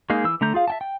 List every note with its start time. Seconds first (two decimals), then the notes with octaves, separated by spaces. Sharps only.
0.10 G#3 A#3 D#4 G#4
0.24 E3 E6
0.41 D3 A3 A#5 G6
0.54 F4 G#4 F5
0.68 E5 G5 A5
0.81 G5